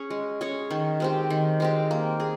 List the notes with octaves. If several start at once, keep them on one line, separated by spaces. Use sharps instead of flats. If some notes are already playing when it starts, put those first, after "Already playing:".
Already playing: C#4 G#4 C#5
G#3
C#4 G#4 C#5
D#3
G#3 C4 G4
D#3
G#3 C4 G4
A#3
G#4